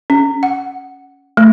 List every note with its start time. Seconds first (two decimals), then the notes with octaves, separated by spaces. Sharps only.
0.10 C#4
0.43 F#5
1.37 A3